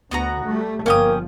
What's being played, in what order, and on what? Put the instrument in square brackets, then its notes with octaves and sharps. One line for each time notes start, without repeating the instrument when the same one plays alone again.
[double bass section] D2 D3 [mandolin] B3 F#4 A#5
[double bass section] G3 A3
[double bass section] G1 F3 [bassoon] A#3 [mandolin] C#4 G5 D#6